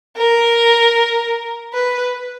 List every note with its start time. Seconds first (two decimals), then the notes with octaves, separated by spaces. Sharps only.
0.17 A#4
1.73 B4